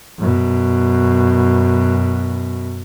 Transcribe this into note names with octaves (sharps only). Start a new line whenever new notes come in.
F#2 B2